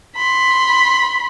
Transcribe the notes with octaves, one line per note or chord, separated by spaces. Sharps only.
B5 C6